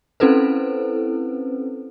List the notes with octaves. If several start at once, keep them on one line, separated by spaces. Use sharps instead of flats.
C4 C#4 E4 A4 B4 C5